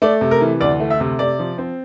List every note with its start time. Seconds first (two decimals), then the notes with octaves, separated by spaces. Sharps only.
0.02 A3 D5
0.21 C3
0.31 A#4
0.41 E3
0.61 D2 D5
0.80 A3
0.90 E5
1.00 C3
1.19 C3 D5
1.39 F3
1.58 C4